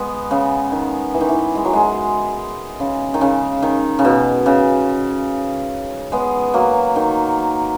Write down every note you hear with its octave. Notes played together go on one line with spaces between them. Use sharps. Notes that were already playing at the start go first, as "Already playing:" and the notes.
Already playing: G#3 B3
C#3
D#3
E3
D#3
E3
G#3
F#3
G#3
C#3
D#3
C#3
D#3
C#3
B2
C#3
G#3 B3
F#3 A#3
D#3